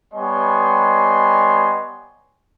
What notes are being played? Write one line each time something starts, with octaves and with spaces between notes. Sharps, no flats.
G3 B3 C#5 D#5 G#5 C6